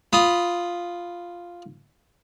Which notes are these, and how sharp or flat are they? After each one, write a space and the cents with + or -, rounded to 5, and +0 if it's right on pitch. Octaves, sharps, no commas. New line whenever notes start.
F4 +0 B5 +0 D#6 +0